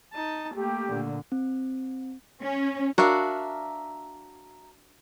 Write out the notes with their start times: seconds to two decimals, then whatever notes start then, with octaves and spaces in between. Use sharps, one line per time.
0.13 D#4 A5
0.55 A3 A#3 G4
0.88 A#2 D3
1.32 C4
2.41 C#4
2.98 D4 F#4 A#4 E5 F5